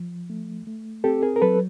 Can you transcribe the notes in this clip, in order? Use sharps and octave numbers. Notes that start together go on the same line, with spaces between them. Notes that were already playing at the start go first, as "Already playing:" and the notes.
Already playing: F3
A3
A3
C4 G4 A4
G#4 A#4
A#4
F#3 A4 B4